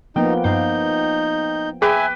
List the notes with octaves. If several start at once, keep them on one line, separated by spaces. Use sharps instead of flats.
F3 A#3 B3 D#4 G5
G2 D#4 F5 G6
G#4 B4 E5 G5 G#5 D6